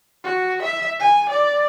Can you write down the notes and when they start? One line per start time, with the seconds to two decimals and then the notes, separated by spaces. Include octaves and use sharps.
0.25 F#4
0.63 E5
1.00 G#5
1.30 D5